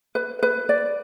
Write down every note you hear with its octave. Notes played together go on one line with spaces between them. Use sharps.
B4
B4
D5